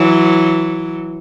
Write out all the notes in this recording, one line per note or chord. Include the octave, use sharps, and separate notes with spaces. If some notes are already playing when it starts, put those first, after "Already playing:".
Already playing: E3 F#3